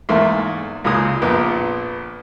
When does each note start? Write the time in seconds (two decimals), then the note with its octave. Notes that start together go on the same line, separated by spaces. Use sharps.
0.09 E2 G#2 A3 A#3
0.84 C#2 A#2 G#3 D#6
1.22 A#1 F2 A#2 B3